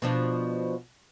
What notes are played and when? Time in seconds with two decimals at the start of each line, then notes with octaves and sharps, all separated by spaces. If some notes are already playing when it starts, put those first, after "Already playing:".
0.02 B2 F3 D4